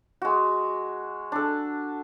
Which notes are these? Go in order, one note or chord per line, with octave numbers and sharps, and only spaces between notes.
G#3 F#4
D4 A4